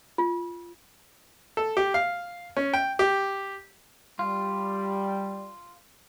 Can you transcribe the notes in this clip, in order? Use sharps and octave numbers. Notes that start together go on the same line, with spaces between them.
F4
A4
G4
F5
C#4
G5
G4
G3 F4